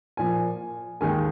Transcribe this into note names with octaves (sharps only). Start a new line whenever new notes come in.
A#2 F3 A#3 G#5
D#2 D#3 G#3 G#5